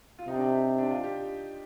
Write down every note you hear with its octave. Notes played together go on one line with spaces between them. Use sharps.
F4
C3 D#4
D4
D#4
G4
D4
F4
G4